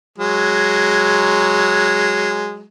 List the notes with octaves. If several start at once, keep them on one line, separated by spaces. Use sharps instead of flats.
F#3 G#3